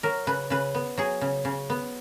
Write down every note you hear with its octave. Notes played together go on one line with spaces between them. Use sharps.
F#3 A#4
C#3 B4
C#3 B4
B3
F#3 G#4
C#3
C#3
B3